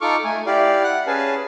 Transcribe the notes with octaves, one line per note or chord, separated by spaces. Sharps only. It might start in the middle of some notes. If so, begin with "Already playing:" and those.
D#4 F4 A4 C#6 D6 F6
A3 G#5
E4 G4 D5 F5
F#5 F#6
C#4 G#4 B4 F5 G#5 A5